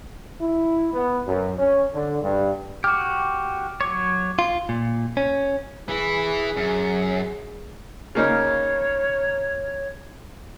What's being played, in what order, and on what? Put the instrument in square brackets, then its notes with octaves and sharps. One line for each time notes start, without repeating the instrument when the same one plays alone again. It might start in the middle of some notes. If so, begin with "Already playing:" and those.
[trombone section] E4
B3
F#2
C#4
D3
G2
[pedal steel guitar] F#4 G4 [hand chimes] D6 F6
[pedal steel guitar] F#3 C#5 [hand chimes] D6
[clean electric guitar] F4
A#2
C#4
[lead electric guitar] E3 E4 [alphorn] G#4
[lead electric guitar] F#2
[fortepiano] C#3 A#3 D#4 [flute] C#5